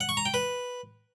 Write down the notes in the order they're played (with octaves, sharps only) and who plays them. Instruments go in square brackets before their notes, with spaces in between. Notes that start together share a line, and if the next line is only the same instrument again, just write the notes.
[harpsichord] F#5
C#6
A#5
G5
B4